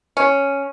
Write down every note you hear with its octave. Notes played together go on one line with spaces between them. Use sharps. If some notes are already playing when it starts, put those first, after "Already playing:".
C#4